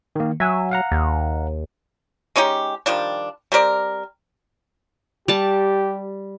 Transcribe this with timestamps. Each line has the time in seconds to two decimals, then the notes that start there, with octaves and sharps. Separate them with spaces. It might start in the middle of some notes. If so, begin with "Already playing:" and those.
0.16 D#3 A#3
0.40 F#3 E5 G#5 E6
0.71 F5 F#5 A#5
0.92 D#2
2.36 G#3 C#4 D#4 G4
2.86 D#3 F3 G3 D4
3.52 G3 C4 A#4 D5
5.28 G3 G4 A5